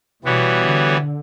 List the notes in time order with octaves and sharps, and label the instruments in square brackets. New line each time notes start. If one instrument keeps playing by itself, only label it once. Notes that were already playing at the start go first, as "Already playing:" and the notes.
[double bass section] B2 [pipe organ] E3 G3 B3 F#4 C#5
[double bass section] D3